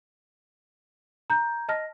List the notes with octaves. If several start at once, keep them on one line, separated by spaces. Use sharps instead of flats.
A#5 G6
D#5 A5 F6 A#6